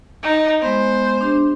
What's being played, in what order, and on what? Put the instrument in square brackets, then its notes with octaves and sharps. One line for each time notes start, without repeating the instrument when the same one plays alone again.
[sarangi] D#4
[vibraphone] G#3 B3 [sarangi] C5
[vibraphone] D4 G4